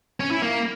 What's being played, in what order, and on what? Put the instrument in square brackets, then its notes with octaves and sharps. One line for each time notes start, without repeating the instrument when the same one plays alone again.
[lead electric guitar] C#4
E4
A#3